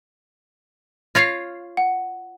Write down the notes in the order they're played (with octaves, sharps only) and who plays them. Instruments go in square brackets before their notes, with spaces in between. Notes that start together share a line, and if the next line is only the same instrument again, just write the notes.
[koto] F4 C#5 F5 [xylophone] A#6 C7
[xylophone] F#5